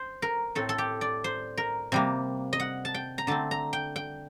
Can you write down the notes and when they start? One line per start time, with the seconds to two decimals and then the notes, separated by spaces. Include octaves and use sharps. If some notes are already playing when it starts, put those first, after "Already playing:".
Already playing: C5
0.22 A#4
0.55 A2 A3 C4 A4
0.69 A4
0.78 G4
1.01 D5
1.24 C5
1.58 A#4
1.92 C3 G3 A#3
2.53 D#5
2.60 F#5
2.85 A5
2.94 G5
3.18 A#5
3.27 D3 A3 C4 A5
3.51 A#5
3.73 G5
3.96 G5